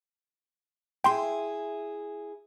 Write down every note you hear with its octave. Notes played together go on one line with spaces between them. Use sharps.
E4 G#4 G5 C6